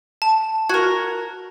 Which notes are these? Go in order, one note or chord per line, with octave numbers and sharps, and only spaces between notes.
A5
F#4 A#4 G#6